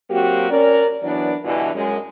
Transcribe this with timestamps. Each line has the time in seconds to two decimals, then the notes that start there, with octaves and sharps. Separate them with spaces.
0.11 F#3 A#3 C4 F#4 G4
0.50 C#4 A#4 D5
1.03 E3 F#3 B3 D4 D5
1.44 G2 B2 D3 E3
1.75 F#2 G#3